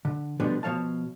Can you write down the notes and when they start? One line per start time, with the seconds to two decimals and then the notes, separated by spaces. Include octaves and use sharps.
0.05 D3
0.40 B2 D3 F3 G3 B3 D4
0.63 B2 F3 C#5 F5 A5